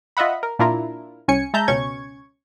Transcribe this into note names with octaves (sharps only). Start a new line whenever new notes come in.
F4 D#5 E5 F#5 B5
A#4
A#2 D4 E4 F4 A#4
C2 C#4 G#5 C#7
G#3 E5 A5 A#5 G6
C#2 B2 C#4 C#6 G#6